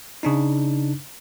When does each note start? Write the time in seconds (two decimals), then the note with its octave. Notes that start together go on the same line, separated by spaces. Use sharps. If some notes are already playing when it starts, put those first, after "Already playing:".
0.23 C#3 D4 D#4